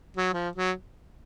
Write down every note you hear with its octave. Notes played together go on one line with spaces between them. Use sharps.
F#3
F3
F#3